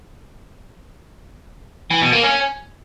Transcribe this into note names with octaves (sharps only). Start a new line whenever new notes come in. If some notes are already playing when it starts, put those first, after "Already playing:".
E3
B2
A#3
C#4